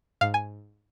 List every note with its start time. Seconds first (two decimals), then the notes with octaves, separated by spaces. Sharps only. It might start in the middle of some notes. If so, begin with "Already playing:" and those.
0.21 G#2 F5
0.34 G#5